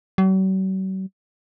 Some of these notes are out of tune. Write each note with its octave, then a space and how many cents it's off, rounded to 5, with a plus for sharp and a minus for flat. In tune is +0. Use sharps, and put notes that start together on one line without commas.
F#3 +45